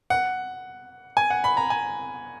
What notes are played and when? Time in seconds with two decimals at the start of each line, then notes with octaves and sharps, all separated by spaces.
0.10 F#5
1.17 G#5
1.30 F#5
1.44 B5
1.57 A#5
1.70 G#5